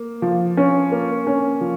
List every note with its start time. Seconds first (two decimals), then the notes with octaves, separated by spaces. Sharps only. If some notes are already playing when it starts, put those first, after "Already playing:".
Already playing: A#3
0.22 F3
0.57 C#4
0.92 A#3
1.27 C#4
1.61 F3